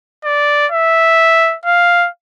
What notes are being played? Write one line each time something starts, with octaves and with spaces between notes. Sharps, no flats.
D5
E5
F5